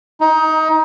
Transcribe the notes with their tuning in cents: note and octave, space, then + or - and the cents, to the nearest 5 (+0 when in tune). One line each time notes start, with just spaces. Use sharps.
D#4 +20